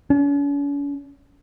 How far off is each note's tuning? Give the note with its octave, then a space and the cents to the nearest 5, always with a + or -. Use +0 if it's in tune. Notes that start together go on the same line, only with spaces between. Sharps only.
C#4 +45